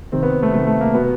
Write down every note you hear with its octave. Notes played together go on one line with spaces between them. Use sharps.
C3 D#3 C4
B3
A3
C3 D#3 A3
A3
A#3
B2 B3